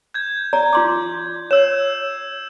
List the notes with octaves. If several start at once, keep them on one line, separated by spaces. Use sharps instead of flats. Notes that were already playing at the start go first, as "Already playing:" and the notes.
G6 G#6
D5 A#5
F4 C6 D6
C#5 E6 E7